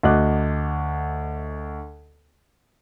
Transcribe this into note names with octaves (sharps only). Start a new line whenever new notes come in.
D2 F#4 D#5 D6 F#6